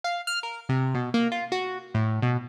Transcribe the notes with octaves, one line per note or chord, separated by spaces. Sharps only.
F5
F6
A#4
C3
B2
A#3
F4
F#4
A2
B2